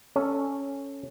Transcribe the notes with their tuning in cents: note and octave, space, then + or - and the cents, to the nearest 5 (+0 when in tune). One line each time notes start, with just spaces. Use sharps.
C#4 +0 A4 +0 C#5 +0